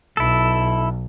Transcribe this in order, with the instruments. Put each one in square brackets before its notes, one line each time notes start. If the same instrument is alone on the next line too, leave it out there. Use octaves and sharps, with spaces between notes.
[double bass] B1 [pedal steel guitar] E4 A4